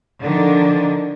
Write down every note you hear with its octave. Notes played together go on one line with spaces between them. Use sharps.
D3 D#3 F3 D4